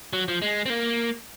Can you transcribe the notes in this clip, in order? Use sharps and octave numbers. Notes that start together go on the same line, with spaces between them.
F#3
F3
G#3
C4
A#3